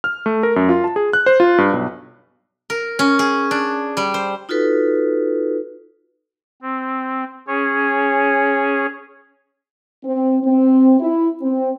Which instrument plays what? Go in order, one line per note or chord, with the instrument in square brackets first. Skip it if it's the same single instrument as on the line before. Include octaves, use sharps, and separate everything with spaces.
[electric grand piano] F6
A3
A#4
F#2
F4
A5
G#4
F#6
C5
F4
G2
B1
[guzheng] A#4
C#4
G#4
D4
G3
C5
[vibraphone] D#4 F4 F#4 A4 B4
[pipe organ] C4
C#4 G#4 C#5
[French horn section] C4
C4
E4
C4